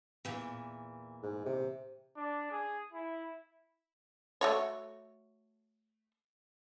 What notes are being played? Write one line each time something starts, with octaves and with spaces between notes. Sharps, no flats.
E2 A#2 E3
G#2
C3
D4
G#4
E4
A3 F#4 C#5